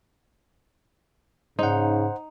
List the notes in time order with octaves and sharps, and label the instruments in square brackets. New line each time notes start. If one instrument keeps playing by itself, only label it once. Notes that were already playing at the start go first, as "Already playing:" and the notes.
[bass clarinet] G#2 [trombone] C#3 [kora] D#4 [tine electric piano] C5 F#5